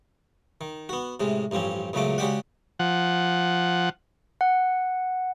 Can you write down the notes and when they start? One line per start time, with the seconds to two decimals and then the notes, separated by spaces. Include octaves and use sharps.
0.61 D#3
0.89 B3 F#4
1.20 A2 C3 G#3
1.51 A1 G2 F3 C4 C#4
1.93 C#2 A#2 C#3 F#3 A3 D6
2.18 C#3 G#3 F#4 G4 D5 F#5
2.79 F3 F#5
4.41 F#5